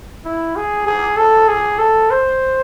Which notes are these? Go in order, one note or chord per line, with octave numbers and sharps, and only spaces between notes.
E4
G#4
G#4
A4
G#4
A4
C5